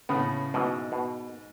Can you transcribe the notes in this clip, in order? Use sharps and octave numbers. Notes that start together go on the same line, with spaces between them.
A2 C#3 B3
G#2 B2 E3
B2